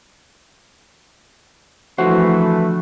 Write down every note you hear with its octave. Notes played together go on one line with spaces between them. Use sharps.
D3 E3 F3 A3 F#4 C5